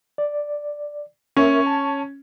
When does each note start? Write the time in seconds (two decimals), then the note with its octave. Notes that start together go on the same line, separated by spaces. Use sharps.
0.18 D5
1.36 C#4 A#4 E5
1.66 A5